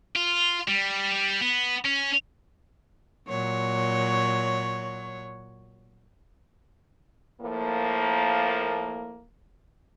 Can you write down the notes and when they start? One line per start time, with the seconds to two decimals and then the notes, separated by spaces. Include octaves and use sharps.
0.16 F4
0.68 G3
1.41 B3
1.85 C#4
3.28 A#2 F#3 C#5
7.41 A2 F3 A#3